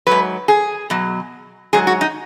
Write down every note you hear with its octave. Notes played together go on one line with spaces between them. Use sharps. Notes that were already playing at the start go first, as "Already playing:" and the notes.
G#2 F#3 B4
G#4
B2 F#3
G#2 F#3 G#4
F#4
D#4